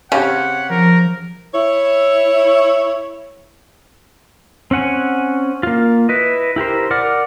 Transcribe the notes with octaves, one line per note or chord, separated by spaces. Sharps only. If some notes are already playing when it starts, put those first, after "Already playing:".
C#3 C4 G4 C#5 F#5
F3 A#4
E4 C#5
C4 C#4 F#5 G#5
A#3 F4
E4 B4 D#5
E4 G4 A#4 C5
A#4 D5 F#5 D6 F6